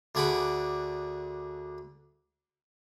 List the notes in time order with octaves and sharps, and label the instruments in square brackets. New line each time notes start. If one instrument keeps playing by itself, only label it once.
[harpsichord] D2 D3 G#4 F#5 B5 D6